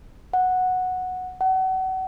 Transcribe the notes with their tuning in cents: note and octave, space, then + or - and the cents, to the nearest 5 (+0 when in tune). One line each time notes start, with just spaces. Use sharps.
F#5 -5
F#5 +35